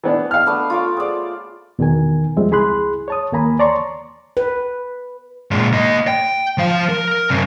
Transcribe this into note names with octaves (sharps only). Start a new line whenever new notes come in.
E3 B3 D4
F5 F6
A3 B3 D4
F4 C#5 D6
G#4 C5 D5
E2 B2 D#3 A#4 G#5
E2 F3 G3 G#3 C4 E5
C#2 E4 G#4 B5 C6 F#6
C#5 A5 D#6
D#2 E3 A#3 G#5 A#5 B5
C#5 D5 A5 A#5 C6 C#6
B4
A#2 G#3
A#3 D#5
G5
F3 F5
A#4
F#2 C3